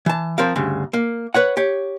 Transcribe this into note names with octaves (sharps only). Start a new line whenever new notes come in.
E3 A5
F3 C4 A#4 F5
D2 G2 C#3
A#3
B4 C#5 F#5
G4 C#5